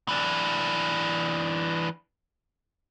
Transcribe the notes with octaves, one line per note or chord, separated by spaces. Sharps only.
E3 D4